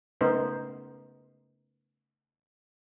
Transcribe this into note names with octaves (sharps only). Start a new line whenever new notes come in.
C#3 A3 B3 D#4 A#4 C5